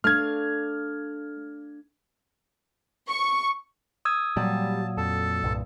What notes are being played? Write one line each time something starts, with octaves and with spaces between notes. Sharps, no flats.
A3 D4 F5 F6 G#6
C#6
D#6 E6 G#6
A#2 F#3 G3 A5
F2 A4 A5
C2 G2 A#2